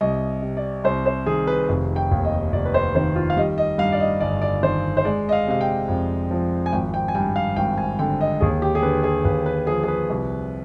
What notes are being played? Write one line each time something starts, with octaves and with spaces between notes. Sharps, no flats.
C2 D#5
C3
D5
C2 C5
C5
D#3 G#4
B4
F1
G5
D#2
D#5
F1 D5
B4
C5
D#3 C5
F4
F5
G3 D#5
D#5
G2 F5
D5
D#5
G1 D5
D5
D#3 C5
C5
G#3 D5
D#5
F5
C3 F5
G5
F2
F3
G#5
G#1 G5
G5
G#5
G2 G5
F5
G#1 G5
G#5
D3 G5
D#5
D#2 G#4
G4
G#4
D3 B4
G#4
D#2 B4
B4
F3 G#4
G#4
B4
C2